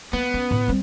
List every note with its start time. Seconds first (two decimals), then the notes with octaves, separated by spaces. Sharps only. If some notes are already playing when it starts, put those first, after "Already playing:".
0.13 A#3 B3
0.34 C#4
0.51 A2 D3
0.68 G3 C4